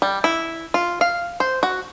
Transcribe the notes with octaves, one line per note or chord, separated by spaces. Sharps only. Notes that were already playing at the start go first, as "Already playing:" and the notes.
G3
E4
F4
F5
C5
F#4